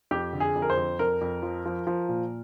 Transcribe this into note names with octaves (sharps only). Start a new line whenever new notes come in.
F2 G4
D3
G#4
F2
A#4
C5
F2
F2 A#4
F2
F3
F3
F3
A#2